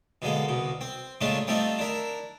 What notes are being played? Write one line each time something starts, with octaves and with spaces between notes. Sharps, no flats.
B2 D3 G#3 A#3
C2 B2
C4
A#2 C#3 G#3 A3 D4 F4
G3 A3 C4 D4 D#4 F4
D4 E4 A#4